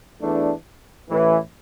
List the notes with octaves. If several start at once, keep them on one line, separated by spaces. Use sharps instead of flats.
E2 E3 A3 D4
A1 A2 E3